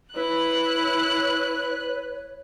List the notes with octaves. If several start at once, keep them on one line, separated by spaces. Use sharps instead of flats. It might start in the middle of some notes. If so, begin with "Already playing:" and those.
E4 B4 C#5 F#6